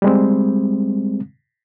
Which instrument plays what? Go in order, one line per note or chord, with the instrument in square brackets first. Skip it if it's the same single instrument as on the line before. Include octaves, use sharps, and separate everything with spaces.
[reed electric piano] G3 G#3 C4